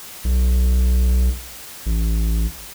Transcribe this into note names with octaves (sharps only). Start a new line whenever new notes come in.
B1
A1